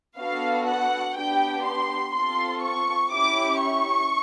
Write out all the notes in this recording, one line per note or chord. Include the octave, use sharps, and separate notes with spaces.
B3 D4 F#4 A4 F5
F#5
B3 D4 G4 G5
C6
C4 F4 A4 C6
C#6
C#4 E4 G4 D6
C#6